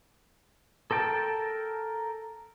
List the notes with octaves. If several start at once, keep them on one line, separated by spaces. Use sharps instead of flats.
A4 A#4 G5 A5